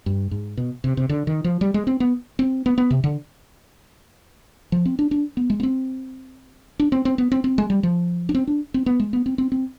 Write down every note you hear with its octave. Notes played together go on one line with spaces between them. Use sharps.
G2
G#2
B2
C3
C3
D3
D#3
F3
G3
G#3
C4
B3
C4
B3
B3
C3
D3
F3
C4
D4
D4
B3
G#3
B3
C4
D4
C4
C4
B3
C4
C4
G#3
G3
F3
D4
C4
D4
C4
B3
G#3
B3
C4
C4
C4